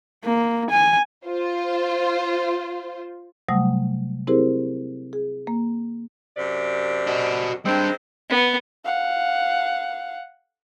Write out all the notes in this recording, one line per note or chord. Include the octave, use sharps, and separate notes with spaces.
A#3
G#5
F4 C5
C3 F#3 G3 A3 F#5 D#6
C4 E4 G4 G#4 A#4 C5
G#4
A#3
F#2 C3 D5
F#4 D#5
D#3 G3 G#3 C4 D4
B3
F5 F#5